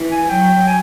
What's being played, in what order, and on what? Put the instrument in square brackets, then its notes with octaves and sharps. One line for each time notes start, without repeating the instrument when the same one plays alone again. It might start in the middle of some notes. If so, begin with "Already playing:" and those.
Already playing: [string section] E3
[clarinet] G#5
[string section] F#3 [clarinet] G5
[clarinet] G#5